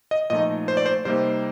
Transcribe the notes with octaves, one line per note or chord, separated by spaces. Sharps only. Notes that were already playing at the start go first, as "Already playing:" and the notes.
D#5
A#2 F3 A3 D#4 D#5
C5
D5
C5
C3 G3 A#3 D#4 C5